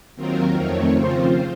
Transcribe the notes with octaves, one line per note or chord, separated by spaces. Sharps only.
D#2 D#3 F#3 C4 F4 A#4
F2 D#3 A3 C4 C#5
C#3 F3 C4 F4 C5